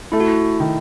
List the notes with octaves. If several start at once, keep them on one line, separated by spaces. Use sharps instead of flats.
A3 E4
F#4
E4
D#3